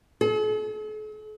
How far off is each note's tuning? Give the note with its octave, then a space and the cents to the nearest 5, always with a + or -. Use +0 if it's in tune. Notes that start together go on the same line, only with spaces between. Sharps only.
A4 -45